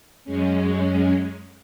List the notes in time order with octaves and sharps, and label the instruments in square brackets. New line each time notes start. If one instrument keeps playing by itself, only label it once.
[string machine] F#2 G#3 C#4